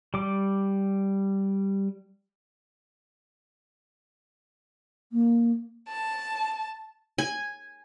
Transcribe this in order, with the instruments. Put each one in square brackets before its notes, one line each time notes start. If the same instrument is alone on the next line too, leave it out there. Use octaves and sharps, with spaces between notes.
[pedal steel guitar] G3 D6
[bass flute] A#3
[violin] A5
[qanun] G#5